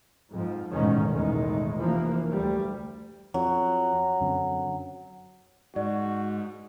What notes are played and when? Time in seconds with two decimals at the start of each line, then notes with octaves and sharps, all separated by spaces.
0.31 F2 G#2 F3
0.72 A1 E2 G#2 B2 D#3 C#4
1.11 B1 E2 A2 D#3 G#3
1.77 F1 E3 F3 A#3
2.31 D2 G3
3.34 F2 F#3
4.21 F#2 D3 C4
5.76 G#2 F#4 D5